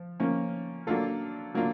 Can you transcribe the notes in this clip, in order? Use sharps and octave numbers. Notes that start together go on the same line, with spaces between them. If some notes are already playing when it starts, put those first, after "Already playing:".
Already playing: F3
F3 A#3 C#4
F#3 A#3 D4 F4 A4
F#3 A#3 D4 F4